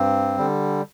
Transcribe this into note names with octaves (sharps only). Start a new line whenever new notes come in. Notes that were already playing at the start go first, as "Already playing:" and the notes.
Already playing: G2 C4
D3 G3